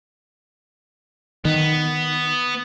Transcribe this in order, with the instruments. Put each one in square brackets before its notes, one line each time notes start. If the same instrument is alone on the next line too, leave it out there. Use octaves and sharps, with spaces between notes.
[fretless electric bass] D#3 [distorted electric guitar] B3